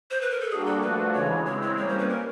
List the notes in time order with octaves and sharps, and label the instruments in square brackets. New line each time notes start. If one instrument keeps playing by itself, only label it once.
[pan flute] C5
B4
A#4
A4
[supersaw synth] G3 A#3 D4 F#4 [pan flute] G#4
[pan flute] A4
[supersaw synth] F3 A3 D4 F#4 [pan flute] B4
[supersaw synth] C#3 E3 G#3 [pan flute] C#5
[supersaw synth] G#3 C4 E4 [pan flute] C#5
[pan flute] C#5
[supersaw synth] G3 A#3 C#4 [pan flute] C#5
[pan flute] C5
B4
A#4